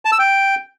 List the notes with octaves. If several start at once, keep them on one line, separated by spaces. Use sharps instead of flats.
A5
E6
G5